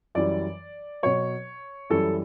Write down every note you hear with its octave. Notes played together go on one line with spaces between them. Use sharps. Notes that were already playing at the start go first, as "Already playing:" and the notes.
F#2 E3 G3 D5
B2 F#3 C#5
F#2 E3 G3 A4